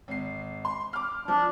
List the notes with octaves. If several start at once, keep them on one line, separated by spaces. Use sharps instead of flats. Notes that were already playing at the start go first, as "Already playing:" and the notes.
G#1 C7
C6
D6 F6
F3 D4